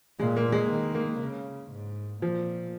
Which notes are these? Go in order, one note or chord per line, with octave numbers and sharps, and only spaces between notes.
A#2 G#3
A#3
G#3
D#3
A#3
C#3
G#2
A#2 F3